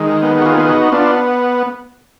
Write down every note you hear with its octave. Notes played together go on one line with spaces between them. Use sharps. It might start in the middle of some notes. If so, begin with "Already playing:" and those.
Already playing: D#3 G#3
B3
F#4
F4 G#4
B3 G#4
D#4 F#4
B3 D4 F4